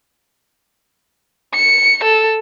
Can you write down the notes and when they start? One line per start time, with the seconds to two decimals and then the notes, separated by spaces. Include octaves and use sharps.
1.54 C#7
2.04 A4